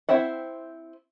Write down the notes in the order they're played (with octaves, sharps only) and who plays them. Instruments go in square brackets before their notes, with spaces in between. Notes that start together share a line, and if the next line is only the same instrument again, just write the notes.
[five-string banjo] C4 E4 C5 E5 F#5